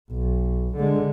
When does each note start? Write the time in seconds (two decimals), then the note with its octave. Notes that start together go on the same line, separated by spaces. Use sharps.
0.12 B1
0.76 D3 G#3